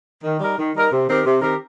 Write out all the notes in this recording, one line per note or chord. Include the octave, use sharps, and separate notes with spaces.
D#3
G3 D#4 A#4
D#3
G3 D#4 A#4
C3
D#3 C4 G4 A#4
C3
D#3 C4 G4 A#4